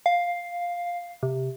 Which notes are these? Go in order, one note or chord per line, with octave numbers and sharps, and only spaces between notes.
F5
C3